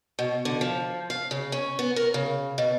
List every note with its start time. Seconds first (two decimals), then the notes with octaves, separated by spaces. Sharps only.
0.19 B2
0.45 D3
0.61 F3
1.10 F5
1.31 C#3
1.52 C#4
1.79 B3
1.96 A#4
2.14 C#3
2.58 B2